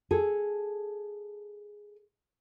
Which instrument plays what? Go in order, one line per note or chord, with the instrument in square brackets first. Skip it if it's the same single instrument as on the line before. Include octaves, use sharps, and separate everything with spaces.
[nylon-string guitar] G#4 A4